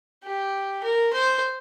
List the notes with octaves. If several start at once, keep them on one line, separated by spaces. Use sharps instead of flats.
G4
A#4
C5